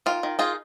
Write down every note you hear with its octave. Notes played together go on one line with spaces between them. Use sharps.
D#3 F4
D#3
D#4 F4 G#4